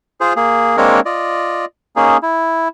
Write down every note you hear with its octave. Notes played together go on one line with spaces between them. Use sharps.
F4 G#4 C5
A#3 G#4
G#3 A#3 C4 D4 A#4 C#5
F4 D5 D#5
A#3 C#4 D#4 G#4
E4